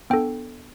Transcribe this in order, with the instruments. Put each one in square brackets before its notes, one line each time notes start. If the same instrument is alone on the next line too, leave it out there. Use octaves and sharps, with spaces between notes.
[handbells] B3 D4 A4 G5